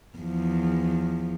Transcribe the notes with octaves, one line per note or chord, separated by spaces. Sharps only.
E2 F3